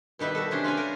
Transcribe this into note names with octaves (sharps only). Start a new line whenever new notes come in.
B2 D#3 G3 B4 E5
F#4 A4
C3 C#4 D4 G4
F4 B4 F5 G#5
A#4